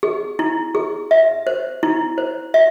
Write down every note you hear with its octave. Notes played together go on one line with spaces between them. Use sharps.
G#4
E4
G#4
E5
C5
E4
C5
E5